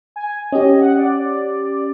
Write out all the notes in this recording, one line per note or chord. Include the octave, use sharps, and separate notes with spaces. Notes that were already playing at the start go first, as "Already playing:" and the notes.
G#5
C#4 G4 D#5
F#5
D5